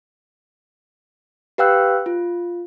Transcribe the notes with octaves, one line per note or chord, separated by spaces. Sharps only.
G4 B4 F5 G5 E6 F#6
F4